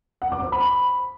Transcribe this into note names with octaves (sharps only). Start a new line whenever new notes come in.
F#5
D6
C5
B5